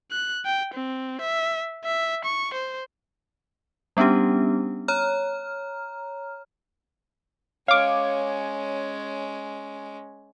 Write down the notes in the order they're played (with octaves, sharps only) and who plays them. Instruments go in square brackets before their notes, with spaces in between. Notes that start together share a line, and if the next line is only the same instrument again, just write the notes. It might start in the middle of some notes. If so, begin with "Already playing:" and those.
[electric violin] F#6
G5
C4
E5
E5
C#6
C5
[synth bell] G3 B3 C#4 D4 G4
C#5 A#5 F6
[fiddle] G#3 C#4 [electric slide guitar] C#5 [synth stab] F5 D6